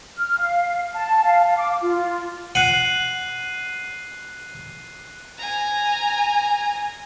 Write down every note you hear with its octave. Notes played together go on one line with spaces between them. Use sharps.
F6
F5
A5
F5
D6
F4
F#5 F#6 C7 D#7
G#5 A#5